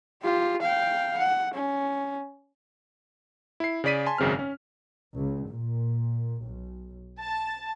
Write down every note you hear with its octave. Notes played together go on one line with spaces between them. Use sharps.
F4 G4
F5 G5
F#5
C#4
E4 C7
C#3 G#4 D5 B6 D#7
G#5 A5 C6
G#1 F#2 C#3 C4 F6
C#4
C#2
A#2
B1
A5